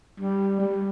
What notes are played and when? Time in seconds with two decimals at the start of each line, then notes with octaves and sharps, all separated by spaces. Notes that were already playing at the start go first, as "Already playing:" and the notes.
0.20 G3
0.60 G3